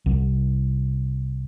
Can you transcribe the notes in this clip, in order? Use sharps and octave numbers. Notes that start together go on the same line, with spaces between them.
C2